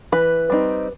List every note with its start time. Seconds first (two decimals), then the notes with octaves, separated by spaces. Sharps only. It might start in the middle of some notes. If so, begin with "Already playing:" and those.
0.12 E3 B4
0.50 G3 C4 D#4